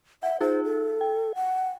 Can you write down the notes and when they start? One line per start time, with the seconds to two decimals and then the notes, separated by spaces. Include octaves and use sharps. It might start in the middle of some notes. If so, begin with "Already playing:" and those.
0.23 E5 F#5
0.41 D#4 F4 G#4 C5
0.64 A4
1.01 G5
1.35 F#5